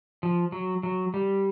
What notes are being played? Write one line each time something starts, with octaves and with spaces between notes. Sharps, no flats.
F3
F#3
F#3
G3